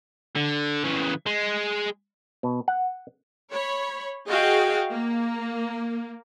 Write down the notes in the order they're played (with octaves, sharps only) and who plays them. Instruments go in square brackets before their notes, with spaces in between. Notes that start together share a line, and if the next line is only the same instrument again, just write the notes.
[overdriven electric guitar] D3
C#3 E3
G#3
[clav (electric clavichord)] B2
F#5
[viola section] C#5 B5
F#4 G#4 D#5 F5 G5
A#3